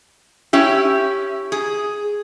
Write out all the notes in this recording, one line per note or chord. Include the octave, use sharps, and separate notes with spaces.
C#4 E4 G4
G#4